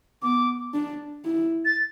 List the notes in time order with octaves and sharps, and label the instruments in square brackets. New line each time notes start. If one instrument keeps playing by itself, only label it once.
[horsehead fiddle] B3 [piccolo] D6
[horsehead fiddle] D4
E4
[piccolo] A6